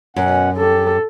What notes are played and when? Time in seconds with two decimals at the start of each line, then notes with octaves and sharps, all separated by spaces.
0.16 F#2 B2 C#4 F#5
0.57 G4 A4